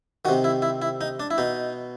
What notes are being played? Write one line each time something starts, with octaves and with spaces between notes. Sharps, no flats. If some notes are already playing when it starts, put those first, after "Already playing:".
C3 D#3 F#4
E4
E4
E4
D#4
D4
E4
B2 D#4